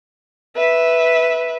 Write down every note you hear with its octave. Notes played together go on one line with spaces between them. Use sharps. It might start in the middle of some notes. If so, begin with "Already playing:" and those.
B4 E5